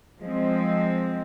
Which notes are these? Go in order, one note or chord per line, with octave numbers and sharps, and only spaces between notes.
F3 G#3 C4